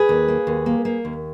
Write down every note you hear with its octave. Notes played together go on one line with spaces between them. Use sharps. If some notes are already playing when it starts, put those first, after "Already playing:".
Already playing: G#4 B4
D#2
A#3
D#2
A#3
A#3
D#2